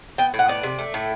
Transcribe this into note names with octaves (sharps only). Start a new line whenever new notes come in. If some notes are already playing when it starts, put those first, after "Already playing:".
B3 G5
A2
F#5
B3 D5
C3
A3
A2